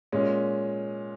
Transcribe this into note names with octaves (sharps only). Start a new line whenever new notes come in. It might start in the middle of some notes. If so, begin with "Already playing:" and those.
A#2 G#3 C#4